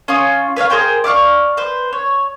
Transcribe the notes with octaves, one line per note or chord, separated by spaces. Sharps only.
C#4 F4 D#6
B4 C#5 D#5 F5
G#4 A#4 C5 G5
D5 E5 F5 C#6
B4 C5
C#5